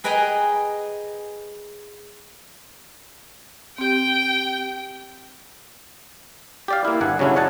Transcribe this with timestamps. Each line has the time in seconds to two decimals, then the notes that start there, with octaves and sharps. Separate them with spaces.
0.04 G#4 B4 D#5 G5 G#5 A#5
3.78 C4 G4 G5
6.68 G4 D5 F5
6.85 A#3 E4
7.01 G1 G2 F#5 G#5
7.19 C#3 F#3 A3 C#4 D4 E4
7.36 C#5 D#5 F#5 G#5 A5